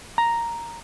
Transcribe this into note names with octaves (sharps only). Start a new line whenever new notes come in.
A#5